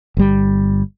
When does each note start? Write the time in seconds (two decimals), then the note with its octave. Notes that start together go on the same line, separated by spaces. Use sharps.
0.17 G1 G3